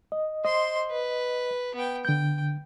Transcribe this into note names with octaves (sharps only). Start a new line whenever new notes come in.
D#5
C5 D#5 C6
B4
B3 G5
D3 G5 G6